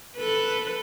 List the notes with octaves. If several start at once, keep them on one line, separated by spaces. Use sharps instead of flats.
A4 B4